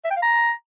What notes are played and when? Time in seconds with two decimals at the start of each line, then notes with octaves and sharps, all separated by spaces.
0.05 E5
0.11 G5
0.16 F5
0.22 A#5